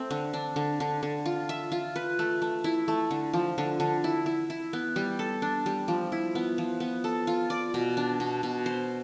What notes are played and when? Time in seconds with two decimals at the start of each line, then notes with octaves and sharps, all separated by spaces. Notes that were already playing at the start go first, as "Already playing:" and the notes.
Already playing: A3 C4
0.11 D3
0.33 D4
0.56 D3
0.80 D3
1.03 D3
1.26 F4
1.49 E5
1.72 F4
1.96 B4
2.19 A3
2.42 A3
2.64 E4
2.88 A3
3.11 D3
3.33 F3
3.58 D3
3.80 D3
4.04 E4
4.26 E4
4.50 E4
4.73 B3
4.96 G3
5.19 A4
5.42 D4
5.66 G3
5.88 F3
6.12 E4
6.35 B3
6.58 F3
6.80 B3
7.04 A4
7.27 F4
7.50 D5
7.74 B2
7.97 D4
8.20 B2
8.43 B2
8.66 C5